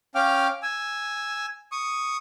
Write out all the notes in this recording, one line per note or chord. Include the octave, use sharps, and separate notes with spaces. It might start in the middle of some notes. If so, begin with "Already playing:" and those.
C#4 F5 G5 D6 F6
G#5 E6
C#6 D#6